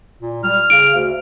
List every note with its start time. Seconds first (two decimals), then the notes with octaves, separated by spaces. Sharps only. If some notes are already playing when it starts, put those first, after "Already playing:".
0.22 A#2
0.44 G3 F6
0.70 C#3 D7
0.95 D2